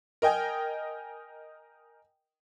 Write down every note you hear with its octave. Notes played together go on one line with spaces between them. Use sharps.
A#4 D#5 G5 G#5